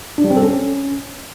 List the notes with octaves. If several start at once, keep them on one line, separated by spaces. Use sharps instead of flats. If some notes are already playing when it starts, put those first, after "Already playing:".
D4
G3
C4
A4
C#4